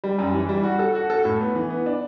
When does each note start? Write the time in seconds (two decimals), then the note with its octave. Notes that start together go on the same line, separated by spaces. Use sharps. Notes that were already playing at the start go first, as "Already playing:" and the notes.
0.04 G3
0.19 F#2
0.34 E3
0.49 G3
0.63 F#4
0.79 A4
0.95 F#4
1.10 A4
1.25 A2
1.41 B3
1.55 E3
1.70 B3
1.86 D4